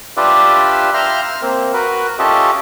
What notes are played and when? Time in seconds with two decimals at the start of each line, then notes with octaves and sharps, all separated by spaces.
0.17 D4 F4 G4 B4 D5 E5
0.94 E5 F5 G5 A#5 C6 F6
1.23 F6
1.42 A#3 C4
1.74 F#4 A#4 B4
2.19 C#4 F4 G4 A4 D#5 E5